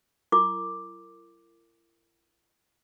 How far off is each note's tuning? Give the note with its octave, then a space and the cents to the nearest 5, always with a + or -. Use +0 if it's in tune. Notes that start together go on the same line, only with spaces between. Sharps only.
E4 +45 A#4 -30 D6 +0